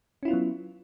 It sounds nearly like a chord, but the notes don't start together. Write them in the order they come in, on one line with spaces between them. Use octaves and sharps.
C#4 E4 F4 B3 F#3